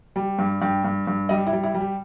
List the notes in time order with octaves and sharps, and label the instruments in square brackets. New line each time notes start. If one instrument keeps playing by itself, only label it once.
[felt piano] G3
G2
G2 G5
G2
G2
G3 D#5
E4
G3
E4
G3
G4